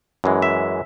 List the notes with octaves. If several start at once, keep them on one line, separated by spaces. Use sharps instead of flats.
F#2 E3 G#3
E5